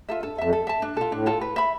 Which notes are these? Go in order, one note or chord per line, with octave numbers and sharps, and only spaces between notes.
F4 A4 E5
G2 A4
F2 E5 A5
A4
E5 A5
G2 D4
B2 F4 A4
A2 D4
F4 A4
B4
E5 B5